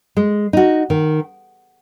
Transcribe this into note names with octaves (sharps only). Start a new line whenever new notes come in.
G#3
D#4 F#4
D#3